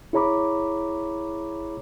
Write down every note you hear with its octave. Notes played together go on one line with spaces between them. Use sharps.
E4 G#4 C#5 A#5 B5 D6